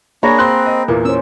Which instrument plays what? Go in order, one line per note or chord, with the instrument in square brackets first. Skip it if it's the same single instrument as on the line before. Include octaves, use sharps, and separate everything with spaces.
[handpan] A#3 G#4 [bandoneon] D4 [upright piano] C#5 [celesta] A#5 B5 A#6
[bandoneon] C4 [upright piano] C6 F#6
[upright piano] D#5
E2 A#2 A#3
[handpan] C#4 C5 [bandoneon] E6